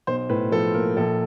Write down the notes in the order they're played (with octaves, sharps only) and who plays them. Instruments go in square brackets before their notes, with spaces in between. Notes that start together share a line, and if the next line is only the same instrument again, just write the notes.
[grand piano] B1 C5
A2 B4
F3 A4
A#3 A#4
A#1 A4